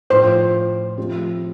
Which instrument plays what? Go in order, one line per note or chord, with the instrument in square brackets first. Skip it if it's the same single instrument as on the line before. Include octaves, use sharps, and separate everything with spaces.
[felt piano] A2 F3 D4 F4 [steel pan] C5
[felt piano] F3 A3 C4 G4